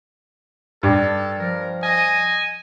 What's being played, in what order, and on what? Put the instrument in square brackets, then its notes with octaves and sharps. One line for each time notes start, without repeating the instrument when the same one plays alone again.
[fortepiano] G2 [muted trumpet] A4
[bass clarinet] F3 [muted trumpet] A#4
[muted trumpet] D#5 [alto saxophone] G#5